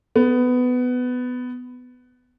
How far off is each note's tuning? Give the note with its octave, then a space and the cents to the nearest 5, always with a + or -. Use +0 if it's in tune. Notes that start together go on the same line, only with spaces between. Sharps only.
B3 +15